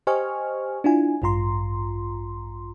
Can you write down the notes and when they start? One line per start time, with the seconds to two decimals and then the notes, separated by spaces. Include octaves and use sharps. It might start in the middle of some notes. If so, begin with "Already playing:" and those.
0.07 G4 C5 D#5 G#5 C#6 F6
0.84 D4 E4 F4 G#5
1.22 A1 G2 F4 A#5 C6